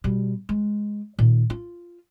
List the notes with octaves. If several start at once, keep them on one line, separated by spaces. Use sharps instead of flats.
B2 G3
G#3
A#2 D#3
F4